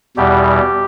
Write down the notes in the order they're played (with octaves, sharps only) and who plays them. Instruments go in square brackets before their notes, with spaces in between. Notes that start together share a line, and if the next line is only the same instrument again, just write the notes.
[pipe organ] E2 B2 G3 G4